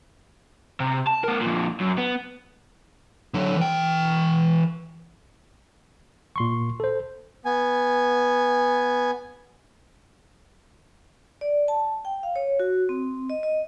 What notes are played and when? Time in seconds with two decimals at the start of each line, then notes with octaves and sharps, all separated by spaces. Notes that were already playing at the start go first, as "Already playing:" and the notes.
0.80 C3
1.07 A5
1.24 B3 A#4
1.42 F2 A#2
1.81 F#2
1.98 B3
3.34 D3 F#3
3.57 E3 G5
6.36 A#2 C6 C#6
6.80 A4 C5
7.45 B3 G#5
11.41 D5
11.68 A5
12.05 G5
12.23 F5
12.36 C#5
12.59 F#4
12.89 C4
13.30 D#5
13.43 D#5